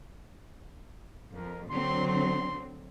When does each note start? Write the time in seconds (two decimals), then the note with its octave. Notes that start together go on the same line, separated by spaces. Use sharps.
1.35 F2 A#4
1.70 D3 F#3 C4 C6
2.07 C6